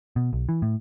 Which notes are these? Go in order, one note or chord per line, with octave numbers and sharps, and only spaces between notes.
B2
B1
E3
A2